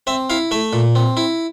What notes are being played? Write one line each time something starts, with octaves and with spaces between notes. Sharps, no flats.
C4 E5
E4 F5
A3 E5
A#2
C4
E4